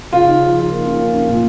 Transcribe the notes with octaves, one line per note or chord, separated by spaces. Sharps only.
C#3 F4
D#4
F3
F3
A#3
C#4
A#3
C#4
A#2